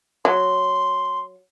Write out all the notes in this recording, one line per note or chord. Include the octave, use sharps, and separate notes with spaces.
F#3 C6